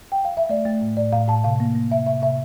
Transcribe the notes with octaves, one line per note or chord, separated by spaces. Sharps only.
G5
F5
E5
A3 D5
A3
A2
A2 D5
A2 F5
A2 A5
C3 F5
A#3
A#3
C3 E5
C3 E5
C3 E5